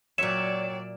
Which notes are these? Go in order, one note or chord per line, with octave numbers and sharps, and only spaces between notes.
A#2 F#3 C#5 D5 E5 G5 E7